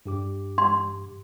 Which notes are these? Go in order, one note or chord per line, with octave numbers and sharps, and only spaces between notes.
G2 G4 D6
C6